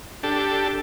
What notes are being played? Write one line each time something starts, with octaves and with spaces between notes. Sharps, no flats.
D4 G4 A4